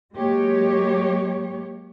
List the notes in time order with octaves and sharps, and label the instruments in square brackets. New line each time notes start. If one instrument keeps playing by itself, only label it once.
[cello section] F#3 G#3 A#3 G4 C#5